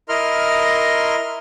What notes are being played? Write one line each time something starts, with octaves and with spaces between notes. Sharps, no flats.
E4 A#4 D#5 C6 F6